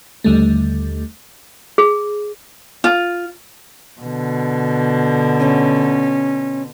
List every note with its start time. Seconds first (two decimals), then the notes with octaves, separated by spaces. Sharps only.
0.24 D#2 D3 G3 A3
1.78 G#4
2.84 F4
4.01 B2 D3
5.40 C#4